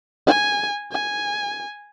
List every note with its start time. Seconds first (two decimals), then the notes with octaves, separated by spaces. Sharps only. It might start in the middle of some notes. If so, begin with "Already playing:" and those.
0.27 G#5
0.92 G#5